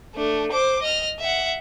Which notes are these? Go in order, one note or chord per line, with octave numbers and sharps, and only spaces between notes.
A3 D4
C5 D6
D#5 F6
E5 F#5